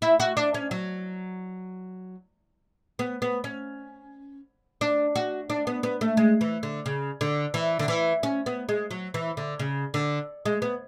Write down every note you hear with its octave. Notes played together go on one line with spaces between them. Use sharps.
E4
F#4
D4
C#4
F#3
B3
B3
C#4
D4
F#4
D4
B3
B3
A3
G#3
E3
D3
C#3
D3
E3
D3
E3
C#4
B3
G#3
F#3
E3
D3
C#3
D3
G#3
B3